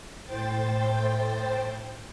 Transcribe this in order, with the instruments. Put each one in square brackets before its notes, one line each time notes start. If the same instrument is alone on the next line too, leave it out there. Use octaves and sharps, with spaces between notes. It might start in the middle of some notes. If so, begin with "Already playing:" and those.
[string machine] A2 C5 G5 A6